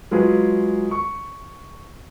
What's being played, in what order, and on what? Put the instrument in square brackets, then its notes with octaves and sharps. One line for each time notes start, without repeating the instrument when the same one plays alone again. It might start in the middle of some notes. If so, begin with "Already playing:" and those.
[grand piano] F#3 G#3 F4 G#4 B4
C#6